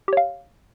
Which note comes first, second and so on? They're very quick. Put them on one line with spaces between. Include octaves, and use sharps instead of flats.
G4 C#5 F5